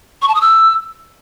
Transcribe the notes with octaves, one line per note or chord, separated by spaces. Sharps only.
C#6
A5
D#6
E6